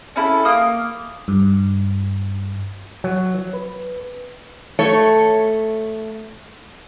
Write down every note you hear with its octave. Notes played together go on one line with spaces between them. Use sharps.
C#4 E4 A4
A#3 D#6 F6
G2
F#3
B4
A3 C#5